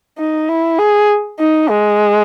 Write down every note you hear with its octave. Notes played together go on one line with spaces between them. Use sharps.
D#4
E4
G#4
D#4
G#3